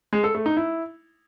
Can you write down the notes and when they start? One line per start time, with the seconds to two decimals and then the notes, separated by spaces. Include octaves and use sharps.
0.13 G#3
0.24 A4
0.35 A3
0.46 D#4
0.57 E4